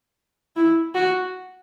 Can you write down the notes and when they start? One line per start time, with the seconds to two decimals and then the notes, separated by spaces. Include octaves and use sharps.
0.56 E4
0.95 F#4